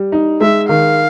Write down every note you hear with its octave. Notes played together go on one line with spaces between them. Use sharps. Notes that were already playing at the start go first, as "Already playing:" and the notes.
Already playing: G3
D#4
G#3 E5
D#3 F5